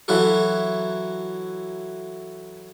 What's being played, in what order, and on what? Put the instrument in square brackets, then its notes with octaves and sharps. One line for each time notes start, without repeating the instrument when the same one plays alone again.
[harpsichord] E3 F#3 E4 F#4 A4